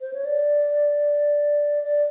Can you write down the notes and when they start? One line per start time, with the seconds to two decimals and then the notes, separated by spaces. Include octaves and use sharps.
0.01 C5
0.13 C#5
0.25 D5
1.83 D5